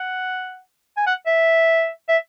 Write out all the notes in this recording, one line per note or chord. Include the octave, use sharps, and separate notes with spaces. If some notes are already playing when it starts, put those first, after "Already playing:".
Already playing: F#5
G#5
F#5
E5
E5